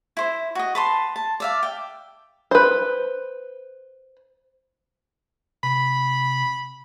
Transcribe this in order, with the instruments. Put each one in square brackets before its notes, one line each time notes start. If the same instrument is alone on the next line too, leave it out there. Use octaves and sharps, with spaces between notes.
[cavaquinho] E4 C5
F#4 D#5
B4 A5 C6
A5
D5 E5 F5
G5
[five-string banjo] B4 C5
[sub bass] C3 [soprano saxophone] B5